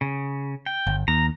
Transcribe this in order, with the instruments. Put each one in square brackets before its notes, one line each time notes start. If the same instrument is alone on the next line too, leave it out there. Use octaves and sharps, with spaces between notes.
[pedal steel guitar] C#3
G5
[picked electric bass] G1
[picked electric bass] D#2 [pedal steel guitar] A#5